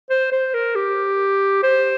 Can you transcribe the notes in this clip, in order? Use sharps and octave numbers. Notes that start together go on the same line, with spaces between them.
C5
C5
A#4
G4
C5